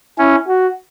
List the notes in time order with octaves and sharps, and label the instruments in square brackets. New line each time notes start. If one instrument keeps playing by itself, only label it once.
[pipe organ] C#4 [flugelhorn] E4
[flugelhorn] F#4